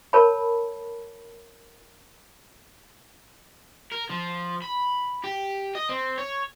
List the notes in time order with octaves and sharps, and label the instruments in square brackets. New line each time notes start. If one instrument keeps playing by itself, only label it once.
[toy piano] A#4 C#5 A5 B5
[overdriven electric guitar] A#4
F3
B5
G4
D#5
C4
C#5